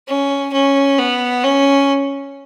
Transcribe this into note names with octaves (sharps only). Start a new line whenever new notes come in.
C#4
C#4
B3
C#4